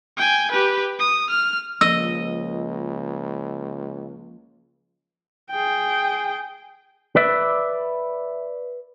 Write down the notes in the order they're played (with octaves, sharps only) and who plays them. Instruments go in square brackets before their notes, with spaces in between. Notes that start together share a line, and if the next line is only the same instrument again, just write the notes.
[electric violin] G5 G#5
G4 B4
D#6
F6
[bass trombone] C#2 [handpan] F3 A#3 [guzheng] D#5 [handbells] E6
[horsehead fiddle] G#4 G5
[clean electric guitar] B4 D5 E5